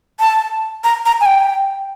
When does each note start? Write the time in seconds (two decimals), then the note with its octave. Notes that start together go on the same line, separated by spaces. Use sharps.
0.20 A5
0.84 A#5
1.06 A#5
1.21 G#5
1.26 G5